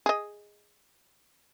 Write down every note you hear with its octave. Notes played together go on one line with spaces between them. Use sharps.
G#4 D#5